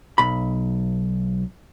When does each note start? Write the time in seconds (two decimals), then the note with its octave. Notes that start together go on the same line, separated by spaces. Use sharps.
0.18 B1 B5